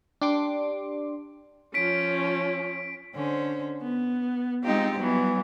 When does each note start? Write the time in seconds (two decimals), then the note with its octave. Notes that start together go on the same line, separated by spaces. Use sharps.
0.21 D4 G4 C6 D6
1.74 F3 C#4 B6 D7
3.14 D3 C#4 C5
3.82 B3
4.64 G#3 C4 D#4 F4 G4
4.99 E3 F#3 G3 B3